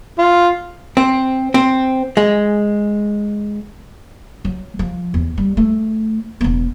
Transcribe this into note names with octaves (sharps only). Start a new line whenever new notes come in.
F4
C4
C4
G#3
F#3
F3
E2
G3
A3
E1 B3